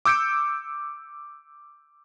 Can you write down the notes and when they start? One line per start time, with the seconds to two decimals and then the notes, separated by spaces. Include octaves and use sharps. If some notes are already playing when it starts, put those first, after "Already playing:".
0.05 D6 E6 G6 C#7 D7